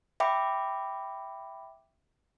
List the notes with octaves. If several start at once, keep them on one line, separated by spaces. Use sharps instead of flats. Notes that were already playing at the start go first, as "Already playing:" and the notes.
E5 G5 B5 D6